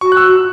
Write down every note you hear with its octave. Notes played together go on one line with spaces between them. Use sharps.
F#4 C#6
F#6
E6